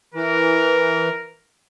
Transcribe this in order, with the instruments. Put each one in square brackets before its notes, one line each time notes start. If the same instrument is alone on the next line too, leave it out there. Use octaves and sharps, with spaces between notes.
[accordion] E3 [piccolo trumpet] A#4